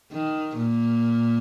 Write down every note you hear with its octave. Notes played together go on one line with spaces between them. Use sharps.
D#3
A#2 A#3